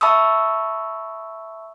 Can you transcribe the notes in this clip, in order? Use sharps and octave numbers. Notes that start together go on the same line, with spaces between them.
E5 A5 B5 C#6 D#6 E6